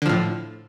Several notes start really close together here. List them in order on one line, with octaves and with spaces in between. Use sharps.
D3 F3 A2